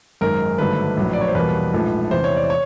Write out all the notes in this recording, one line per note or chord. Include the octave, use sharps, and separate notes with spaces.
G#1 F#2 D#3 G#3 A#4
G#1 G2 D3 F#3 A3 B4
A#1 A2 F#3
D5
C#5
C5
E2 B2 G3 A#3 B4
A#1 G#2 F3 A3
E2 C3 E3 C5
C#5
D5
C#5